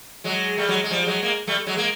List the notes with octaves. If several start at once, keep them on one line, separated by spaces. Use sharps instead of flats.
F#3 G#3
G3 A3
F#3 G#3
G#3
F3 G3
F#3 G#3
G#3 A#3
G3 A3
F#3 G#3
G#3 A#3